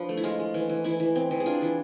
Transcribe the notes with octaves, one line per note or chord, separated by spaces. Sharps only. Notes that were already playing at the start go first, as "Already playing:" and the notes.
Already playing: F3 D4 B4
A3
E4
G#3 F4
G#3
E3
E3
E3 E4
E3
C4
E3
G#4
D4 F4
E3